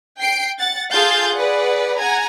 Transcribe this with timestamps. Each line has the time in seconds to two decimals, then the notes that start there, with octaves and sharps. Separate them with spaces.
0.18 G5 C7 D7
0.58 F#5 A6
0.90 F4 G#4 A4 F5 G6 A6
1.34 G#4 B4 D5 F#5
1.96 F#5 G#5 A#5 G#6